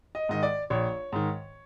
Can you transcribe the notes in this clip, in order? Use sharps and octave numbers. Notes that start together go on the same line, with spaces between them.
D#5
G#2 D#3 D#5
D5
A#1 C#5
G#2 D#3